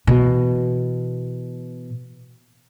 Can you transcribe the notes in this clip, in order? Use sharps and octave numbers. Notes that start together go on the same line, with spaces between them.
B2 E3